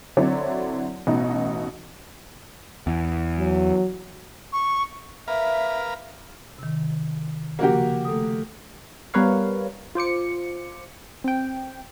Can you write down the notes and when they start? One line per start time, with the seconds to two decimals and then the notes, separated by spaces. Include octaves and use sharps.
0.17 D3 F#3 C4 E4 C#5 D5
1.07 A1 B2 D#4
2.87 E2
3.39 F#3
4.53 C#6
5.28 A#4 B4 E5 F5
6.59 C3 D#3
7.59 C#3 F3 A#3 F#4 G4
8.05 A3 A4 D#6
9.14 G3 B3 A#4 B4 C#5 F5
9.95 F4 C5 D6 C#7
11.24 C4 G5